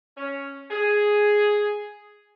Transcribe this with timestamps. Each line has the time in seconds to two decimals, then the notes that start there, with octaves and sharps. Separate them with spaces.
0.17 C#4
0.71 G#4